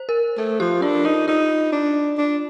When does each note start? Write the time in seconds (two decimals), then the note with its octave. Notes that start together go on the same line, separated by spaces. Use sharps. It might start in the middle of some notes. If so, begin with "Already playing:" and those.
Already playing: C5
0.09 A#4
0.38 A3 A4
0.60 F3 G4
0.82 D4 F4
1.05 D#4 F4
1.28 D#4 F4
1.72 D4
2.18 D4